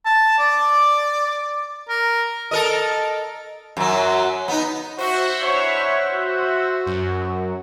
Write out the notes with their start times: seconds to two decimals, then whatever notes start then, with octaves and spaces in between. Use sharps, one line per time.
0.06 A5
0.39 D5
1.89 A#4
2.51 A4 A#4 D#5
3.77 F#2 F#3
4.48 B3 D#4
4.98 F#4 C5 E5 F#5
5.42 D4 E4 C#5
6.14 F#4
6.86 F#2